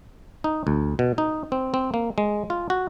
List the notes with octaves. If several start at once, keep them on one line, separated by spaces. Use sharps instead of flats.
D#4
D2
B2
D#4
C4
C4
A#3
G#3
F4
F#4